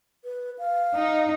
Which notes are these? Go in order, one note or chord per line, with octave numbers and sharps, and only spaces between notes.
B4
F5
D#4